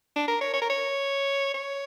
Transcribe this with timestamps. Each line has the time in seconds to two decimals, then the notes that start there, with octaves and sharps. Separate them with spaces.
0.16 D4
0.28 A#4
0.41 C#5
0.53 C#5
0.62 A#4
0.70 C#5
1.54 C#5